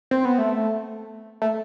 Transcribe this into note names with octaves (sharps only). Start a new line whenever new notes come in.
C4
B3
A3
A3